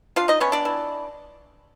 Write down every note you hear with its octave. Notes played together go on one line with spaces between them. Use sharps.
D4 F4 F5
D#4 D#5
B3 C#4 C#5
D4 D5
E3